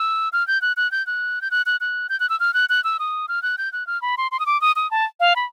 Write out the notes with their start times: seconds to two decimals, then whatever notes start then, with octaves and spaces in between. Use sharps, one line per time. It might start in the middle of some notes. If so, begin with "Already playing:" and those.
Already playing: E6
0.33 F6
0.47 G6
0.62 F#6
0.77 F#6
0.92 G6
1.07 F#6
1.42 G6
1.51 F#6
1.66 F#6
1.81 F#6
2.09 G6
2.20 F#6
2.30 E6
2.40 F6
2.54 F#6
2.69 F#6
2.84 E6
2.99 D#6
3.28 F6
3.43 F#6
3.58 G6
3.73 F#6
3.87 F6
4.02 B5
4.18 C6
4.32 C6
4.40 D#6
4.46 D6
4.61 D#6
4.76 D#6
4.91 A5
5.20 F5
5.36 B5